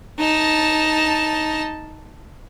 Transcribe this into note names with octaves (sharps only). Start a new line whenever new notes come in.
D#4 A5